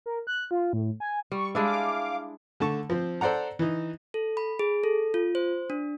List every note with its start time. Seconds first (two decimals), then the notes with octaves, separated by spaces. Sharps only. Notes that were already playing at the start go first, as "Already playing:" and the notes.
0.06 A#4
0.27 F#6
0.51 F4
0.73 A2
1.00 G#5
1.32 G3 C#6
1.55 G#3 D4 E4 F5 D6
2.60 D3 A3 A5 C#6
2.90 F3 C4
3.21 A4 C5 D5 F#5 A#5
3.59 E3 D#4
4.14 A4
4.37 B5
4.59 G#4
4.84 A4
5.14 F4
5.35 C5
5.70 D4